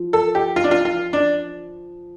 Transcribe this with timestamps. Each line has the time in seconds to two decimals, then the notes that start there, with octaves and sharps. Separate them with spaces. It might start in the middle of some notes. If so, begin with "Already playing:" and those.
Already playing: F3
0.13 A4
0.35 G4
0.56 F4
0.64 D4
0.71 F4
0.85 F4
1.13 D4